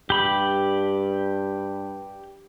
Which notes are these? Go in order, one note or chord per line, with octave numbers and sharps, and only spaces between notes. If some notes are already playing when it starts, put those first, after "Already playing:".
G2 G4 B5